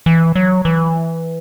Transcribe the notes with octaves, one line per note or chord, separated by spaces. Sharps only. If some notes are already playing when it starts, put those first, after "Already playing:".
E3
F#3
E3